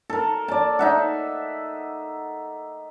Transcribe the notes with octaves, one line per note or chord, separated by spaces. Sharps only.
A4 A#4
D5 A5
D#4 E5 F#5